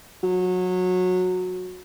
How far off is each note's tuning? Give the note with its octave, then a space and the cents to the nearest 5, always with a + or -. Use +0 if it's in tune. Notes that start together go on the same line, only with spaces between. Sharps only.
F#3 -20